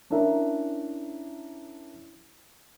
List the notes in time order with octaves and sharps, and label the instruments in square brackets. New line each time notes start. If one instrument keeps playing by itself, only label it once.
[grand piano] C#4 D4 E4 A#4 E5 A#5